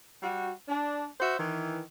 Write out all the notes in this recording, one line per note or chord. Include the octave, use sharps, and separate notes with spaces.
G3 F#4
D4
F#4 C5 E5
D#3 E3